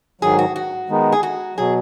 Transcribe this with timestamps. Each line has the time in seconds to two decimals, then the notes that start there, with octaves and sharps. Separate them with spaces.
0.21 G#2 D#3 F#3 G#4
0.39 F#4
0.56 F#4
0.89 D#3 G#3 B3 D#4
1.12 G#4
1.23 F#4
1.57 B2 F#3 G#4